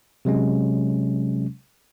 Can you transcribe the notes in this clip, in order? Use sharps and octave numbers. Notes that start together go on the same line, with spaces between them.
C3 F#3 G#3 C#4